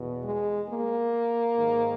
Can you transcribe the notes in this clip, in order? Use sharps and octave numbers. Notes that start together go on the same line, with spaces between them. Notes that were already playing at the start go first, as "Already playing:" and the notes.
Already playing: E2 B2
G#3
A#3
G#2 D#3